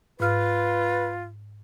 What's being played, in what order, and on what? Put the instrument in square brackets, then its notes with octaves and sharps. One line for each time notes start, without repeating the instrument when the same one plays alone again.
[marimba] G#2 F6 [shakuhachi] F4 [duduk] B4